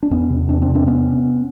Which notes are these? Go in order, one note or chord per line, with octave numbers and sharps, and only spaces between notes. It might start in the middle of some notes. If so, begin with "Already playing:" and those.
D4
E2 B3 C#4
C3
E2 C4 D4
C4 D4
C3
C4 D4
B3 C#4